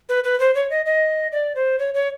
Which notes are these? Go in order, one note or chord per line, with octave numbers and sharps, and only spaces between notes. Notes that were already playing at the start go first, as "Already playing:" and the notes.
B4
B4
C5
C#5
D#5
D#5
D5
C5
C#5
C#5